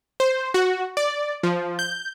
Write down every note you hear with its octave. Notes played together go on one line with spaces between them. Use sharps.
C5
F#4
D5
F3
G6